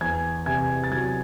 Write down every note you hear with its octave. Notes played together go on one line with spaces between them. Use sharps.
E2 G#5 G#6
C3 G#5 G#6
A6
F#3 G#5 G#6